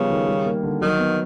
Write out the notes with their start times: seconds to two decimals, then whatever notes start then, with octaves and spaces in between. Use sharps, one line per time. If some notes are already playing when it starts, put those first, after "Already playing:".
Already playing: C#3 F3 G3 B3
0.10 D#3
0.28 G3
0.46 A#3
0.63 D3
0.81 D#3 F#3
0.99 B3